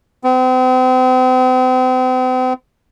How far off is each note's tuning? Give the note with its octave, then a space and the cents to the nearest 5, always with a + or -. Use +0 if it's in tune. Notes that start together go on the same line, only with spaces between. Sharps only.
C4 -40